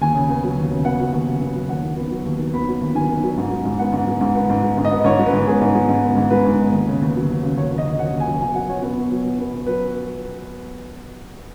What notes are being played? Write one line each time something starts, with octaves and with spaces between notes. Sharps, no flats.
D#2 G#5
C#3
B3
F#3
D#2
C#3
B3 F#5
F#3
D#2
C#3
B3
F#3
D#2 F#5
D#3
B3
F#3
D#2
D#3
B3 B5
F#3
D#2
D#3 G#5
B3
F#3
G#2
G#3
G#2
B3 F#5
G#2
G#3
G#2
B3
G#2
G#3
G#2
D#5
B3
G#2 C#5
G#3
B4
G#2
B3 G#4
G#2
G#3
G#2
B3
G#2
G#3 B4
G#2
B3
D#2
C#3
D#2
F#3
D#2
C#3
D#2 C#5
F#3
D#5
D#2
C#3 F#5
D#2
G#5
F#3
B2 G#5
F#3 F#5
B2 C#5
B3
B2
F#3
B2
B3
B2
F#3 B4